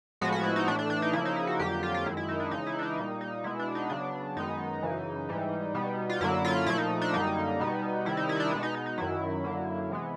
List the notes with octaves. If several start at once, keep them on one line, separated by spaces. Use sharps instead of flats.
A2 F3 G#3 B3 F#4
F#4
E4
D#4
A2 E3 A3 D4
D4
D4
D#4
C#3 F3 A#3 E4
D#4
E4
F#4
F2 D3 F#3 A#3 G4
F4
F4
F#2 D#3 G#3 E4
E4
D#4
D4
C#3 E3 G#3 D#4
E4
D4
D#4
A#2 G3 A#3 D#4
D#4
B2 G#3 B3 E4
D4
D#4
C#3 F#3 B3 D4
F#2 D#3 G#3 B3 D#4
F#2 C#3 E3
G#2 E3 G3
B2 G3 B3
F4
F#2 D3 F#3 A#3 E4
F4
A#2 F3 A3 E4
D#4
D4
F#2 D3 G3 A#3 D#4
B2 G3 B3
C3 D#3 G3 E4
D#4
E4
D#4
D4
B2 G#3 B3 D4
D#4
D#4
D#4
F#2 D#3 F#3 E4
F#2 D3 F#3 A#3
C3 E3 G#3 B3